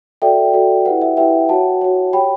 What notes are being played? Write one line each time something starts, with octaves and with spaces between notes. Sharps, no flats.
F#4 A4 D5 E5 G5
F#4 A4 D5
E4 G4 B4 F#5
E5
E4 G4 B4 E5 G5
F#4 C#5 F#5 A5
F#4 C#5
G4 C#5 G5 B5